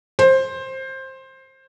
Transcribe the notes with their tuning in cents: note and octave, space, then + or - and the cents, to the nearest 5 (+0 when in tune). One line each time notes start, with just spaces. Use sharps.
C5 +15